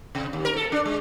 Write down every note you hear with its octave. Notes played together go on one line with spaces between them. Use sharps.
C3
D#2
A#4
A4
D4
G#3